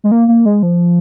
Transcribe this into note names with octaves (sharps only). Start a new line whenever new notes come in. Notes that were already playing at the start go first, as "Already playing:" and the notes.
G#3
A#3
A#3
G#3
F3